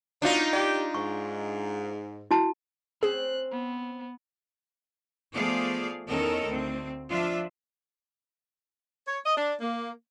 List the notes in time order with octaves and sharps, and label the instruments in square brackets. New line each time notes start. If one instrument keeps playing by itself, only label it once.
[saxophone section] B2 F#3 [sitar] D4 D#4 F4
[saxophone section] G4 [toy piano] D5
[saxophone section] G#2 [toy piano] C#6
[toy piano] E4 F#4 A5
[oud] C4 C#4 [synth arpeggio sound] G#4 [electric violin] F#6
[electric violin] B3
[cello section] F3 A3 B3 G#4 D5 F5
E2 D#3 C#4 A4 A#4 D#5
D2 C4
F3 D4 F4 E5
[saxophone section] C#5
D#5
D4
A#3